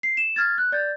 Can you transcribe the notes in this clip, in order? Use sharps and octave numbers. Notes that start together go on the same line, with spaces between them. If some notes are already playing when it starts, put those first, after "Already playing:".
C7
E7
F6 G#6 A6
F#6
D5 G6 A6